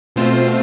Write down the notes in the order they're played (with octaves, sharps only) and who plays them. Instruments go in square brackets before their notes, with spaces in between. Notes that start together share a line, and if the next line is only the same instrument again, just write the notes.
[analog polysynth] B2 A3 C4 F4 C5